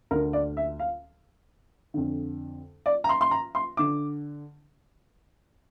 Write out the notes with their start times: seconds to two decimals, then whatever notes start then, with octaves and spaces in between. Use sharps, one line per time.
0.11 D2 D3 A#4
0.33 D5
0.57 E5
0.79 F5
1.94 F2 D3
2.86 D5
3.04 A#5
3.09 C6
3.21 C6
3.31 A#5
3.55 C6
3.77 D3 D6